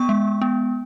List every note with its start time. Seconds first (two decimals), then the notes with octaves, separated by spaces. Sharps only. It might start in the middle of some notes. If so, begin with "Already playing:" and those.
Already playing: B3 C#6
0.09 G#3
0.41 B3